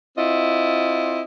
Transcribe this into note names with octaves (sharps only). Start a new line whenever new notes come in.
C4 E4 F4 D#5